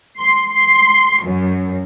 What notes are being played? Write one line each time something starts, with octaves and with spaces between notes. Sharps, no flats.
C6
C6
F#2